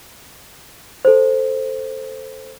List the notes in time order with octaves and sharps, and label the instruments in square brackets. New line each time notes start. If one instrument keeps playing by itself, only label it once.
[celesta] A4 C5